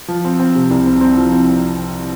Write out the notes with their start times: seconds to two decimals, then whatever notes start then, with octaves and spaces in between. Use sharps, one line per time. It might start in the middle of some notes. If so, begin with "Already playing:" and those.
0.08 F3
0.25 C4
0.40 C4
0.55 C3
0.70 C2
0.86 C4
1.01 C4
1.17 F3
1.32 C4